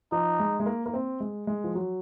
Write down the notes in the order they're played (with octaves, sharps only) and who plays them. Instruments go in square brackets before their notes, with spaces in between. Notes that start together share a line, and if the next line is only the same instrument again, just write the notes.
[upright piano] F3 [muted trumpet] D#4
[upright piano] G#3
G#3
A#3
A#3
C4
G#3
G#3
F3
F#3